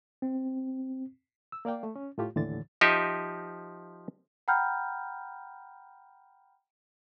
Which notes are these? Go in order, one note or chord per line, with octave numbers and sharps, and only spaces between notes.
C4
E6
A#3 D5 F5 G5
A3
C#4
A2 A3 F4 G4
D#2 A2 D3 E3 A6
F3 D#4 G4 D#5 E5
F#5 G5 A#5 B5 F6 G6